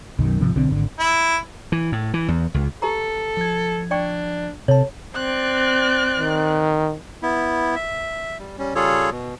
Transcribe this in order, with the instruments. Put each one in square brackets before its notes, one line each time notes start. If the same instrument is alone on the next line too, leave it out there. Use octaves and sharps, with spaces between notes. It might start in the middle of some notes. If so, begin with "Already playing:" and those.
[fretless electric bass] B1 F#2 D#3
G#1 C3 F3
B1 D3 C4 D4
G#1 D3
[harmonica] E4
[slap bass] E3
A2
E3
E2
C#2
[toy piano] G4 B4 A#5 [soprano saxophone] A4
[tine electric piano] F3 G#6
[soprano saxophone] D4 [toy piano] D5 G5 C#6
[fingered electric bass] C3 [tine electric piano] A4 A5 [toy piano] C#5
[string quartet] C4 D5 [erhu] F#6
[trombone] D#3
[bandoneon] B3 E4
E5
G3
G3 C#4
C#3 G3 F4 G#4 A4 C#5
B2